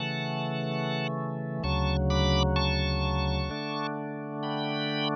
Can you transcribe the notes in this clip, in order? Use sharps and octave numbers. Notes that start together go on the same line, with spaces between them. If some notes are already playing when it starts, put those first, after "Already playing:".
Already playing: C#3 E3 A3 F#5 A5
D2 C#3 F#3 A5 C#6
B5 D6
A5 C#6
D3 A3 D4
G5 B5